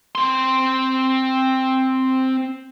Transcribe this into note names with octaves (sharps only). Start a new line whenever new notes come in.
C4 C6